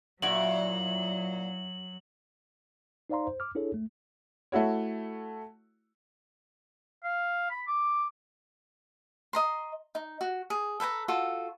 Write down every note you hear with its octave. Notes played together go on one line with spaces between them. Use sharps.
F#2 A#2 F#3 E4 F#4 F#7
D#4 C5 D5 F5 A#5 C6
C5
D6 F6
D4 E4 G#4 A4 C#5
A3
A3 E4 F#4 C#5
F5
B5
D6
D#5 A#5 C6
D#4
F#4
G#4
A4 B4 G5 A#5
F4 F#4 A4